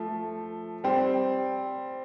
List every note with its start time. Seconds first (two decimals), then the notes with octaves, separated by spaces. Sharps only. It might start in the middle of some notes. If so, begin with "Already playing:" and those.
Already playing: F3 A3
0.84 G3 C4